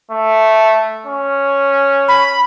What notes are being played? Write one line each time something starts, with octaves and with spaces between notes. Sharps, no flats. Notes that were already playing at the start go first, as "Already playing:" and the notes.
A3
C#4
B5